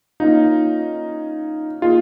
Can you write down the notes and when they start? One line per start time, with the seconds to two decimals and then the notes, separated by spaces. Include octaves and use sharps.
0.20 A#3 C#4 D#4 F4
1.82 A#3 D#4 F4 G#4